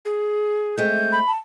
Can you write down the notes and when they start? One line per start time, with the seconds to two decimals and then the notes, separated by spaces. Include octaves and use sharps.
0.05 G#4
0.78 G#3 A3 C4 G6
1.12 B5
1.27 A5